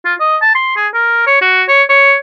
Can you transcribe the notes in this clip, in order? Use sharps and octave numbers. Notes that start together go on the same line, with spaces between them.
F4
D#5
A5
C6
G#4
A#4
C#5
F#4
C#5
C#5